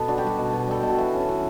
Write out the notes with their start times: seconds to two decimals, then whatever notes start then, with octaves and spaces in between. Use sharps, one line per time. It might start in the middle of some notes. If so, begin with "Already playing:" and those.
Already playing: B2 B3 A4
0.08 D4 F#4
0.18 G4
0.23 G3 F#4
0.39 B2
0.53 B2
0.68 G3 A4
0.80 B2 G4
0.90 F#4
0.98 E3 E4
1.14 C#4
1.29 E3 F#4